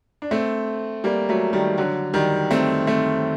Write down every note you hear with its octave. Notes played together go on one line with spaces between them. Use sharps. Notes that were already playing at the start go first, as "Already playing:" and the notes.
D4
A3 C4
G3 A#3
F#3 A3
D#3 G3
D3 F#3
D#3 G3
A3 C4
A3 C4